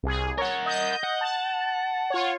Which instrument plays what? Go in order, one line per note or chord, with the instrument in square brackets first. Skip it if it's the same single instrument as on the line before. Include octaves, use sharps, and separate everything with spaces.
[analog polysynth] C2 G#4
[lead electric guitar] A#4 F#5 [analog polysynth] C#5
[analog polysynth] D#5 G6
[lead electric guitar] F#5
[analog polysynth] A5
F4 C#5